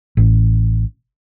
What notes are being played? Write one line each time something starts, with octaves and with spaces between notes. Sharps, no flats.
A1